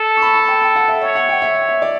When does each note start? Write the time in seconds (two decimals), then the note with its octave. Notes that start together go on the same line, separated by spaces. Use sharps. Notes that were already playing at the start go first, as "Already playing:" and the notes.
Already playing: A4
0.17 C#6
0.22 B5
0.35 A5
0.48 G5
0.62 G5
0.76 F#5
0.88 E5
1.01 C#5 E5
1.15 F#5
1.29 G5
1.42 E5
1.55 E5
1.69 E5
1.82 D5